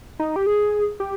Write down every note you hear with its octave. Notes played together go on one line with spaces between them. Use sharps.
D#4
G4
G#4
G4